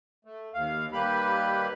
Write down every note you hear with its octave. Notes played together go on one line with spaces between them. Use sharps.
A3
D#2 F5
D#2 G3 A#3 G4 B4 B5